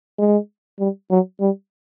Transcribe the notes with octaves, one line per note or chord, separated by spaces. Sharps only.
G#3
G3
F#3
G3